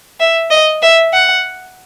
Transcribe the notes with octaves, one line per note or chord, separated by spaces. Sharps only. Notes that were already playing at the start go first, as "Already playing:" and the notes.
E5
D#5
E5
F#5